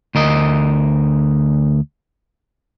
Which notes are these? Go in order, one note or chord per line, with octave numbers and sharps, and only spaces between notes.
D2 A#4 D#5